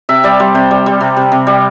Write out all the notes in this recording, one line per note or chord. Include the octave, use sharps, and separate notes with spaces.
C3 E5
G3 D5
G3 C5
C3 C5
G3
G3
C3
C3
C3
G3